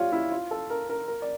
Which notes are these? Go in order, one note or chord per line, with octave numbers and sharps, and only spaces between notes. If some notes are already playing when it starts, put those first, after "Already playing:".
Already playing: F4 G4 C#5 D5
E4
F4
A4
A#4
A#4
A#4
D5